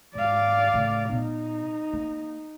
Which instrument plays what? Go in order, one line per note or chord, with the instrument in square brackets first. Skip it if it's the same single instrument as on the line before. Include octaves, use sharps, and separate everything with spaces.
[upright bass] G#2 [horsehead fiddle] D5 F5
[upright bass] A2 C#3
[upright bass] A#2 B3 [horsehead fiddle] D#4
[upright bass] A#3